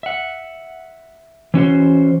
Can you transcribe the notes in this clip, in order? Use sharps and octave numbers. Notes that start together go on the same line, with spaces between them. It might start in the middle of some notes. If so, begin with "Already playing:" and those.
E5 F#5
E3 C#4 F#4 C5